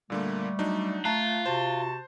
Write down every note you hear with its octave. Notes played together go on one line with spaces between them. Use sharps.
A#2 D3 G3 A3 A#3
F#3 D4 D#4
A3 F4 A5 A#5 F#6
C3 F#4 C5 A5